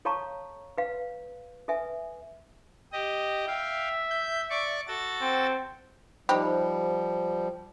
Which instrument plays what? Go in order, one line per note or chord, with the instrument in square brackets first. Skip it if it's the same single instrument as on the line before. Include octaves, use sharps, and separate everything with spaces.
[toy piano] A4 C#5 F5 A5 A#5 C#6
B4 F5
A4 B4 E5 G#5
[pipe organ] G4 D#5
[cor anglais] E5 [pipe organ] F5 G5
[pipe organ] G6
D5 C#6 D6
F#4 A4 A6
[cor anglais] C4
[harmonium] F3 G3 [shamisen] D#4 G4 [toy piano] C5 B5